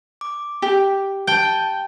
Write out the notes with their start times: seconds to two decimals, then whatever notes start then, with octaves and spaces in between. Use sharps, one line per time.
0.21 D6
0.62 G4
1.27 G5 A5 G6